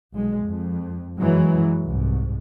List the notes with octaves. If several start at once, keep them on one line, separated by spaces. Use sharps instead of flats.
B1 G#3
F2
F#2 E3 F#3 G#3
C2 G#2